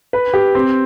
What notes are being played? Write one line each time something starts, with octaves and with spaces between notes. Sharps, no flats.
B4
G4
C4